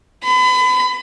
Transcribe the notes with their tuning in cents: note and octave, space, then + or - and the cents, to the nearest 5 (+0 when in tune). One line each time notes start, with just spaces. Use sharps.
B5 +35